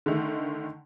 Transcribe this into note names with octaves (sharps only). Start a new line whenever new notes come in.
D3 D#3 A3